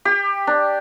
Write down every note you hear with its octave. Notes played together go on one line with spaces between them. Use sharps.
G4
D4